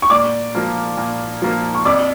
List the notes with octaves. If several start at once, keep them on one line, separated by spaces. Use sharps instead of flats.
C#6
A#2 D5 D6
F3 A#3
A#2
F3 A#3
C#6
F2 D5 D6